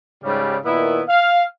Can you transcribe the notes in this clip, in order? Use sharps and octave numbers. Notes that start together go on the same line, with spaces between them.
G#2 C#3 G3
A#2 D#3 B3 E4
F5